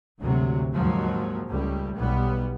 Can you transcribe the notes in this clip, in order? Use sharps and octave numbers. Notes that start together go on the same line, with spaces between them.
G#1 D2 C3 F#3
G#1 D#2 F3 F#3 G#3
C#2 G3 A3
B1 G3 B3